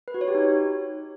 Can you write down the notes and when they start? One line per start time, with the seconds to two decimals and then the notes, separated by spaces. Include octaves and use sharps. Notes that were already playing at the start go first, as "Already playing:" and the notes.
0.08 B4
0.14 F#4
0.21 C#5
0.28 G4
0.35 D#4